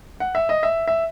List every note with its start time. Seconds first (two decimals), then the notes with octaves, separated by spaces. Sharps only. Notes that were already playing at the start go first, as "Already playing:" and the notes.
0.20 F#5
0.35 E5
0.49 D#5
0.63 E5
0.88 E5